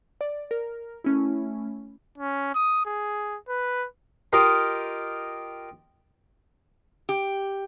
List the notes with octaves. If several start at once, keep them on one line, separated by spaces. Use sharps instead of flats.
D5
A#4
A3 C#4 E4
C#4
D#6
G#4
B4
F4 G4 A#4 D#5
G4